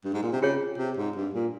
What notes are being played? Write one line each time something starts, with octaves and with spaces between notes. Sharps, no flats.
G2
G#2
A#2
C3
C#3 F4 G#4 C#5
C3
G#2
G2
A#2